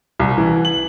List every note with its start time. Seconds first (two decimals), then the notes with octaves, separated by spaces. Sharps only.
0.20 C2
0.38 E3
0.65 F#7